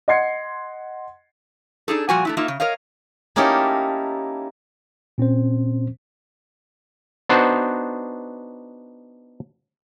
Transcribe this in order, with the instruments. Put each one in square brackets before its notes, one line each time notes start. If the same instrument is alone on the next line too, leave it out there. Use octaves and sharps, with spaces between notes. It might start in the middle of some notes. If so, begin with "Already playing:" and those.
[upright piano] D#5 F#5 C6 G#6 C7 C#7
[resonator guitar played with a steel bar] D4 D#4 G#4 A4
A#2 F3 G3 F#4 F#5 G#5
A3 D4 E4
A#3 D#4 F4 E5
C#3
A#4 C#5 D#5 F5
[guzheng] A#3 C#4 D#4 E4 G4 A4
[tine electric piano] A#2 C4 C#4 C5
[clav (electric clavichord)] B3 D4 D#4 F#4 C5